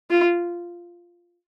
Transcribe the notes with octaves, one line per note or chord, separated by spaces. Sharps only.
F4